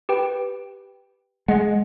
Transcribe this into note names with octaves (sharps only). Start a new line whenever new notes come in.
G4 B4 G5
G#3 D#5 F#5